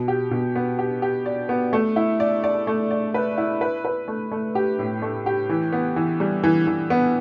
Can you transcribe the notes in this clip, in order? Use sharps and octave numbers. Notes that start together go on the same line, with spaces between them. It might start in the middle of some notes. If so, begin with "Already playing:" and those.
Already playing: B2
G4
B2
B3
G4
G4
D5
B3
A3
E4
D5
D5
A3
D5
B4
E4
B4
B4
A3
A3
G4
A2
A3
G4
E3
B3
E3
G3
E3
E3
B3